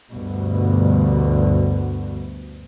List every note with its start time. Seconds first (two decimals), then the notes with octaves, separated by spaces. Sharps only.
0.11 D2 G2 B2